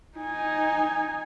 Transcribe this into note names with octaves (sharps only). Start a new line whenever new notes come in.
D#4 G#5